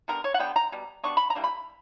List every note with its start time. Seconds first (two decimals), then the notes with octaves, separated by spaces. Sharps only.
0.08 D3 G3 B3 A#4
0.24 C#5
0.34 F#5
0.39 D3 G3 B3 G5
0.56 A#5
0.72 B2 G3
1.03 B2 G3 B3 D4 C#6
1.17 B5
1.30 A#5
1.35 E3 G3 A#3 D4
1.44 B5